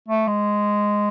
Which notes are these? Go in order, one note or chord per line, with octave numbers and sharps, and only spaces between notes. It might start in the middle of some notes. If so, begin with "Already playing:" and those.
A3
G#3